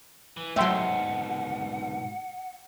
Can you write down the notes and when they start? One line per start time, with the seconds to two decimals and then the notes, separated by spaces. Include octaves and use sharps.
0.37 E3
0.56 G#2 B2 F#3 A3 E5 F#5 G5 C6